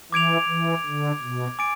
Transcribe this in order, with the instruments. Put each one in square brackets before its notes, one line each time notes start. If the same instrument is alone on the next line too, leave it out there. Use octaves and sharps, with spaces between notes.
[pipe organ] E3 [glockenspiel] D6 G#6 D7 F7
[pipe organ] E3
D3
B2
[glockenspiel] G#5 D6 A6 D7